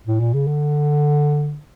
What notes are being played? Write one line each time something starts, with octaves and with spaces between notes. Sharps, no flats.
A2
A#2
C#3
D3